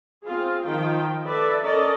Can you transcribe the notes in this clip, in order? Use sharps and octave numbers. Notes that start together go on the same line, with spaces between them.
C4 F4 G#4
D#3 F3 G5
A4 B4 D5 E5
C#4 A4 A#4 D5 D#5